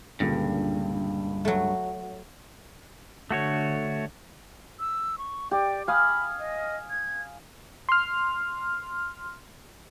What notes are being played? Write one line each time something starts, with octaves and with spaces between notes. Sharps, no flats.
C#2 G2 A#2 D3
F#3 A3
D3 A3 F#4 C#5
E6
C#6
G4 D5
F5 G#5 B5 D#6
D#5
G#6
C6 F6